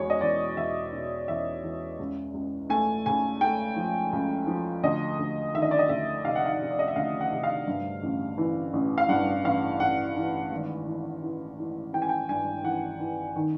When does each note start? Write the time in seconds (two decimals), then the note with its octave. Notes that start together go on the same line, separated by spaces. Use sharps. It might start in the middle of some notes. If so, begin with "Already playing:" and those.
Already playing: E2 B2 G#3 C#5
0.10 D#5
0.21 E2 D5
0.57 E2 E5
0.92 B2
1.28 E2 E5
1.64 E2
1.99 C#2
2.34 C#2
2.70 A3 G#5
3.06 C#3 G#5
3.41 A3 G5
3.76 F3
4.13 C#2
4.47 F3
4.83 D2 D#5
5.19 D2
5.54 D#3 E5
5.62 D#5
5.71 D5
5.79 D#5
5.89 D2 E5
6.25 C3 F5
6.35 F#5
6.46 F5
6.61 C3
6.71 D5
6.79 D#5
6.88 E5
6.96 D2 F5
7.21 F#5
7.32 C3
7.43 F5
7.67 G2
8.03 A1
8.38 E3
8.73 A1
8.98 F5
9.09 G2 F#5
9.45 A1 F5
9.80 A1 F#5
10.17 E3
10.52 G#1
10.87 E3
11.23 E3
11.58 E3
11.93 E3 G5
12.02 G#5
12.09 G5
12.29 G2 G#5
12.64 E3 F#5
13.00 E3
13.36 D#3